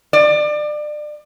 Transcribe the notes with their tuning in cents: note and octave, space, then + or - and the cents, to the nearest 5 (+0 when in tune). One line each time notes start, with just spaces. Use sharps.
D5 +30